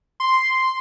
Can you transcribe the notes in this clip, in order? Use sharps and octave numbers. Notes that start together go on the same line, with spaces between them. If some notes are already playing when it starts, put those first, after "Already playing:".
C6